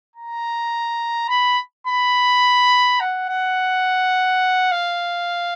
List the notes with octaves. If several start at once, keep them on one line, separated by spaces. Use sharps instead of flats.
A#5
B5
B5
F#5
F#5
F5